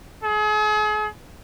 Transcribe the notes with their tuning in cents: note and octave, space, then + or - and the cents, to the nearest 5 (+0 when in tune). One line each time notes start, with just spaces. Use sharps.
G#4 +40